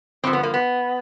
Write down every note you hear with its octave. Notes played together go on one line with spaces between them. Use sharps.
G2 D3 F3 C4
B3
A#3
B3